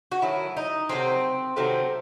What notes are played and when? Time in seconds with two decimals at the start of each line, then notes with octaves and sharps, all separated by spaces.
0.12 F#4
0.22 D#3 F#3 A3 E4
0.57 D#4
0.89 C3 D#3 F#3 A3 C4
1.56 C3 D#3 F#3 A3 C4